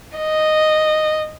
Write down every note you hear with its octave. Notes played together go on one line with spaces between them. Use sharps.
D#5